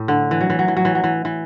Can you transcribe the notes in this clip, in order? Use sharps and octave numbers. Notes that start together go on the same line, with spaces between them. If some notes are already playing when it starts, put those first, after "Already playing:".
Already playing: A2
D3
E3
F#3
E3
F#3
E3
F#3
E3
F#3
E3
E3